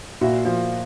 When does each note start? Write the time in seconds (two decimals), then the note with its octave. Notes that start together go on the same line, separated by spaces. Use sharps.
0.21 A#2 E4 F#4
0.45 F3